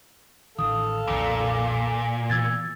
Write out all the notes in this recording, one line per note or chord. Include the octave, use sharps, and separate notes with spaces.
A1 D#3 A4 F5 D#6
B1 F2 A#2 D#3 D6
B2 E3 E6 G#6 A6